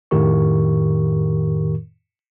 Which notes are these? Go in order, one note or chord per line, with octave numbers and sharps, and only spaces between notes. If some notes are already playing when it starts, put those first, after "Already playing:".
F2 A2 D#3 G4 A#4 C#6